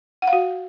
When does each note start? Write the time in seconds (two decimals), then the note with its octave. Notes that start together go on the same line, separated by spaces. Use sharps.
0.22 F#5
0.27 F5
0.33 F#4